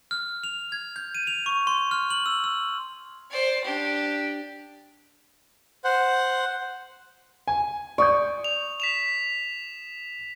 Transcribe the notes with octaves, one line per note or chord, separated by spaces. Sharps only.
F6
F7
G#6
G6
D#7
F7
C#6
C6
F6
F#7
E6
E6
C5 D5
D4 G4
C5 F#5
G#5
D5 C#6 D#6 G6
F7
B6 E7 F7